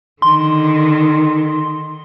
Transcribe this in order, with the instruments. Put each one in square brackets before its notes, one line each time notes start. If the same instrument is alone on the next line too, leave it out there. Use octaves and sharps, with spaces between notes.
[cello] D3 D#3 [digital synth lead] C6